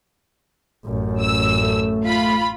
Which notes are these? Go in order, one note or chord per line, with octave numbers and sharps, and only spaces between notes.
A1 F#2
E6
A3
F4 B5